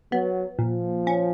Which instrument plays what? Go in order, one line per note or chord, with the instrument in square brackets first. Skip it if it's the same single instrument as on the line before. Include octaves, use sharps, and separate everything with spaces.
[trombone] F#3 [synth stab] B3
[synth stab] A#2 [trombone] F3
[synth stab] C#4